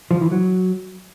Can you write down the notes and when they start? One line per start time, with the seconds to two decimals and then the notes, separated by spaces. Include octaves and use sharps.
0.11 F3
0.21 E3
0.32 F#3